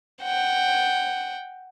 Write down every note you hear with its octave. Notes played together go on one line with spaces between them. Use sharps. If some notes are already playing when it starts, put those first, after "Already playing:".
F#5 G5